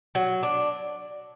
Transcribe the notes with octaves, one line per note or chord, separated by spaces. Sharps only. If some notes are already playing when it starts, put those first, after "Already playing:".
F#3
D4